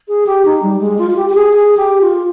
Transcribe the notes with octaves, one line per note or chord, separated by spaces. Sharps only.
G#4
G4
D#4
G3
G#3
F4
F4
G4
G4
G#4
G#4
G4
F4